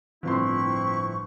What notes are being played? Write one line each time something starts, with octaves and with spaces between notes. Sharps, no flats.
G1 A2 F3 C4 E4 C6 C#6